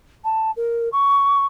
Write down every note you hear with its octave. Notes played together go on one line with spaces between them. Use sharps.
A5
A#4
C#6